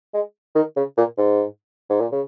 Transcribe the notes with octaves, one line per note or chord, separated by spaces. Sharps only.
G#3
D#3
C#3
A#2
G#2
G#2
A#2
C#3